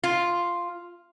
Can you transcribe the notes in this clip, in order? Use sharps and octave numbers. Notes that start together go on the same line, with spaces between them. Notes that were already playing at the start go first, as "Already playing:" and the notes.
F4